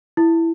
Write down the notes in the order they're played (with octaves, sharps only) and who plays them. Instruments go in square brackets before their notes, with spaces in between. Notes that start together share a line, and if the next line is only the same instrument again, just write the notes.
[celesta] E4